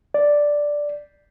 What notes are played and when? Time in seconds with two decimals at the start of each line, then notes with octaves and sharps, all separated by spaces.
0.14 D5